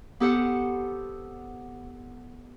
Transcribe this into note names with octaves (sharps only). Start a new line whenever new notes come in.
B3 G4 A4 C5 F#5